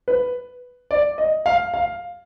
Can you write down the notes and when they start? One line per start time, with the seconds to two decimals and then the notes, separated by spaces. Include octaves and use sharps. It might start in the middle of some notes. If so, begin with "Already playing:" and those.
0.08 B4
0.91 D5
1.18 D#5
1.46 F5
1.74 F5